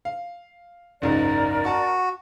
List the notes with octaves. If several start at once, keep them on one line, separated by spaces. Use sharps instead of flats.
F5
F#1 C#2 G#2 A#4 D5
F#4 A5 C#6